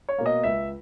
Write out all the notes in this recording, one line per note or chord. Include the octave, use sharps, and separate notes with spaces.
C#5
B2 A#3
D#5
C#2 E5